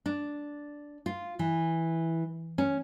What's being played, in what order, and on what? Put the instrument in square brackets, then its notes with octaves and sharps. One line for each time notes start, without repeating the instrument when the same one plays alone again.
[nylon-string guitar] D4
F4
E3
C#4